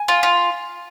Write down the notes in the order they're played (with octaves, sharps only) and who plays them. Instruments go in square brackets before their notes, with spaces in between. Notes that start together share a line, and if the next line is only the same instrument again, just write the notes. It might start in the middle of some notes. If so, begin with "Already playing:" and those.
Already playing: [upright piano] G#5
[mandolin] F4
F4